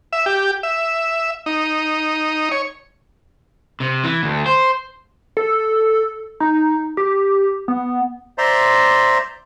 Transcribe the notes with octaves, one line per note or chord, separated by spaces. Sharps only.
E5
G4
E5
D#4
C#5
C3
E3
D2
C5
A4
D#4
G4
B3
C5 D5 E5 A#5 C6